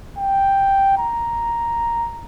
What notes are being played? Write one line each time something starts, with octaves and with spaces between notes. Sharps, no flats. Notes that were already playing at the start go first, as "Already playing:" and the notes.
G5
A#5